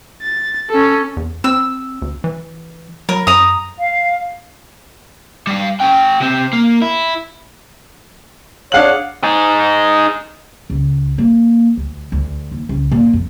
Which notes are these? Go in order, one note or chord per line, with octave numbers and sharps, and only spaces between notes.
A6
C#4 A4
E2
C4 E6
D2
E3
F#3 A#4
F#2 A#5 D#6
F5
G3 F5
C#4 G5
C3 C4
A#3
E4
D4 G#4 C#5 F5 F#5 F#7
D#4 G#4
C#2
A#3
D2
D2
D#2
C#2
A#2
F2